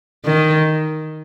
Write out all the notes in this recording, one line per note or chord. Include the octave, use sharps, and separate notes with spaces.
D#3